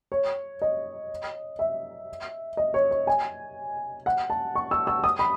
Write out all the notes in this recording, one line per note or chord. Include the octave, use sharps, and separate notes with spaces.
C#5
D#5
E5
D#5
C#5
C#5
G#5
F#5
A5
C#6
E6
E6
D#6
B5